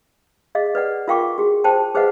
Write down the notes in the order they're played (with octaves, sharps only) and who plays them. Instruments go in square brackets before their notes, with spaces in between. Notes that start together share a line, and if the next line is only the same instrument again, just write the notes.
[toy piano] G#4 D#5 F5
B4 D5 F#5
F4 A#4 F5 G5 C#6 D6
F#4 G#4
C5 G5 A5
G#4 B4 C5 D#5 F5 F#5